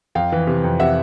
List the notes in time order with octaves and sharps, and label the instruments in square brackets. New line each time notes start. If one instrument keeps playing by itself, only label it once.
[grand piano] F2 F5 G5
E3
C3
F2
C3 E5 F#5